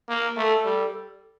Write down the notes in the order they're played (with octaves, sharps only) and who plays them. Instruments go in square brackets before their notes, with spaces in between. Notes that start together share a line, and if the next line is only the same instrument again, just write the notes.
[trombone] A#3
[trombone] A3 [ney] A4
[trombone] G3